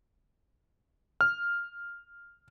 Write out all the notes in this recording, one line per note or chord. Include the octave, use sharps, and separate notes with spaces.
F6